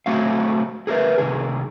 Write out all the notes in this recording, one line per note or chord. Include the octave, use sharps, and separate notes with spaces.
B1 A3 C4 F#4 E5 F5
G#4 A#4 B4 E5
C2 D#3 G#4